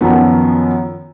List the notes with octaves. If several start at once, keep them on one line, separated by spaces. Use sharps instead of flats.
F#2 D#3 F3 B3